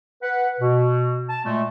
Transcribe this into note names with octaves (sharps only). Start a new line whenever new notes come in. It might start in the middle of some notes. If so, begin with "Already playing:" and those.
B4 F#5
B2
A5
A#2 G#3 A3